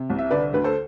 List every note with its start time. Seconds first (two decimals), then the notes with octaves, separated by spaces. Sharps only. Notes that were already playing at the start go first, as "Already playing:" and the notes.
Already playing: C3
0.10 C2
0.18 E5
0.31 D3 B4 D5
0.53 D2 B4
0.64 A4 C5